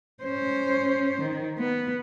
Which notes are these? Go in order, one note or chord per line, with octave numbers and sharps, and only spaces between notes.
C#4 C5
D#3
B3